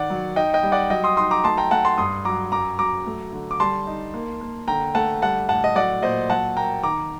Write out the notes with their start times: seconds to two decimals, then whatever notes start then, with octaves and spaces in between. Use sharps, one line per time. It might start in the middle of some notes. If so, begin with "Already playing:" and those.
Already playing: D#3 D5 F#5
0.10 F#3
0.36 D#4 D#5 G5
0.54 D#5 G5
0.63 G3
0.72 D5 F#5
0.90 F#3 D#5 G5
1.04 C6 D#6
1.17 D#4 C6 D#6
1.31 A#5 D6
1.44 A3 A5 C6
1.57 G5 A#5
1.71 A3 F#5 A5
1.85 A5 C6
1.98 G2 C6 D#6
2.25 F#3 A#5 D6
2.52 F#2 A#5 D6
2.78 F#3 A#5 D6
3.06 A3
3.33 D3
3.51 D6
3.60 G3 A5 C6
3.87 D#4
4.14 A#3
4.41 A#3
4.68 D3 G5 A#5
4.95 A3 F#5 A5
5.22 G3 F#5 A5
5.49 A2 F#5 A5
5.64 D#5
5.75 F#3 D5 F#5
6.03 A#2 C5 D#5
6.30 F#3 F#5 A5
6.56 A#3 G5 A#5
6.83 D#3 A#5 D6